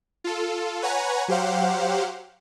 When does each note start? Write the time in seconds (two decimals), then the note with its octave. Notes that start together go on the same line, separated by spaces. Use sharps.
0.24 F4 A4
0.82 B4 C#5 F#5 G#5 A#5
1.28 F#3 G4 C5 F5 F#5